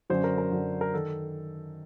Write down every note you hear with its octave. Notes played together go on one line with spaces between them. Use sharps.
F#2 D3 F#3 C5
A#4
A#4
F#2 D3 F#3
A#4
D#3 A4